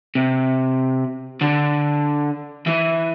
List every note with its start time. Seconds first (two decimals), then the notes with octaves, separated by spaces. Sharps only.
0.15 C3
1.42 D3
2.67 E3